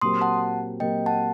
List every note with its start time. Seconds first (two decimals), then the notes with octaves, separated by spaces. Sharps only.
0.01 A#2 F#3 C4 G4 A#4 C6 D#6
0.21 F#5 A5
0.80 A#2 F#3 C4 G4 A#4 D#5 G5
1.06 F#5 A5